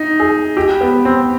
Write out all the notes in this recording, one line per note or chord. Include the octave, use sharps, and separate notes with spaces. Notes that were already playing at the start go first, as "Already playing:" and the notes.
Already playing: D#4
G#4
G4
B3
C4